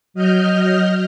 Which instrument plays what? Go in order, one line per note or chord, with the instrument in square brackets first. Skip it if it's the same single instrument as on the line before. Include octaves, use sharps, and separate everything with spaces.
[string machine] F#3 D#5 F6 G6